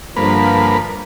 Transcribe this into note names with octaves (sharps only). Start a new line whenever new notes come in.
G2 D3 F3 A#3 B4